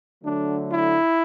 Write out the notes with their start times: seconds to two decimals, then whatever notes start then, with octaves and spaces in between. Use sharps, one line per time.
0.23 D3 F#3 A3 D4
0.70 E4